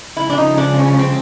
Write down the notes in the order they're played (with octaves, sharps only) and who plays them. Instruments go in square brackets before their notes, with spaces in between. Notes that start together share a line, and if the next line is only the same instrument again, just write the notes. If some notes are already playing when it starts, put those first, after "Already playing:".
[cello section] C#3 F3 G#3 [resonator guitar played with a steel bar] E4
[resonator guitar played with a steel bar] D4
D#4
D4
C#4
C4